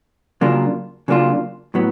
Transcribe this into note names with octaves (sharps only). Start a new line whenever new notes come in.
C#3 F#3 A#3 D4 F4
C#3 F#3 A#3 D4 F4
A2 F#3 B3